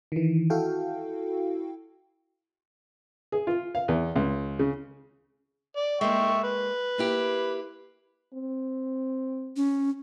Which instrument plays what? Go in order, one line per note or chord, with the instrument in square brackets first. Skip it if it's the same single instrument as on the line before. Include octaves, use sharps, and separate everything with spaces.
[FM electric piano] D#3 E3
E4 F#4 A4 F5 G5
[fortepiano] G#4
F4
F5
E2
C#2
C#3
[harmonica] D5
[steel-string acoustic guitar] G#3 A#3 [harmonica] E5 G5 C#6
[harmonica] B4
[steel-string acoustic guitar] A#3 E4 G4
[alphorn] C4
[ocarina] C#4